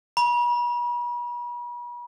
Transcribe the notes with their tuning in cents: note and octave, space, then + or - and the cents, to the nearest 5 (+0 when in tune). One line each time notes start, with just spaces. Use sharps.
B5 -40